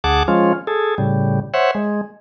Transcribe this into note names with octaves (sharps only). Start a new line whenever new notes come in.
D2 G#4 F#5 A5 D6
F3 G#3 C#4 F4
G#4 A4
A2 C#3 G3
C5 C#5 E5 F#5
G#3